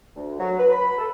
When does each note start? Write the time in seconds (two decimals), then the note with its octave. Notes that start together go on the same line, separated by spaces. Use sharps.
0.16 D2
0.40 F#3
0.59 B4
0.72 B5
0.98 A4